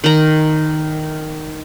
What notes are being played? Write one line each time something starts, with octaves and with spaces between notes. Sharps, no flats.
D#3 A#5